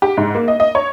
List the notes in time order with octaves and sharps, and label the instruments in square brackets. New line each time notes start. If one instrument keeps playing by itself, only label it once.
[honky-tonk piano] G4
G#2
A#3
D#5
D#5
C#5